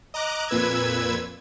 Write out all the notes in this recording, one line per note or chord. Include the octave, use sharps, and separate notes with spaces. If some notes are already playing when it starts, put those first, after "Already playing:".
D#5 A#5 D6 F#6
F2 A#2 B4 E6 G#6